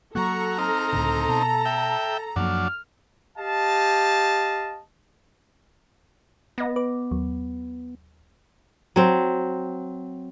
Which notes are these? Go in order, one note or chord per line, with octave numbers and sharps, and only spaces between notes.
F#3 A#3 F#4 A4 A#5 C#6
C4 D#4 F6
C#2 A2 D3
B2 A5
E5 G5
F#2 F3 F#3 A#3 D4 F6
G4 D#5 F5 A5
B3 D#5 A#6
B4 D6
D#2 F#3
F#3 C4